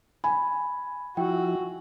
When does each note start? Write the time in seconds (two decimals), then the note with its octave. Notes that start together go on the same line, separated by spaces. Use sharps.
0.24 G#5 B5
1.17 F3 E4 F#4 G5